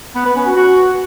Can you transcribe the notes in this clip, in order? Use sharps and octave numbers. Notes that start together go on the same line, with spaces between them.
B3
B4
C#4
F#4
F#4